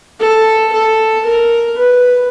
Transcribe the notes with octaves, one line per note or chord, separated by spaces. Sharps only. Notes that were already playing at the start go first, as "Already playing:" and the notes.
A4
A4
A#4
B4